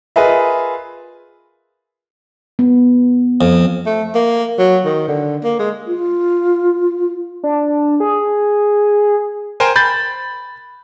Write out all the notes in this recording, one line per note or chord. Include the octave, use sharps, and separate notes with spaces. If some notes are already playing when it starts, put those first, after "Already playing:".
F4 G#4 A#4 B4 D#5 E5
B3
F2
A3
A#3
F#3
D#3
D3
A#3
G#3
F4
D4
G#4
A#4 C5 G5 G#5
B5 G6 A6